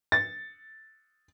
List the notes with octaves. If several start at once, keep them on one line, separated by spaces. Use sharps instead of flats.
A6